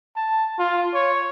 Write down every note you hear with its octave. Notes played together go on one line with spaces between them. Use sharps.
A5
F4
C#5